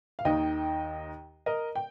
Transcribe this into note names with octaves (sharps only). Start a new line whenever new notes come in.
F5
D#2 D#3 D#5 G5
A#4 D#5
G5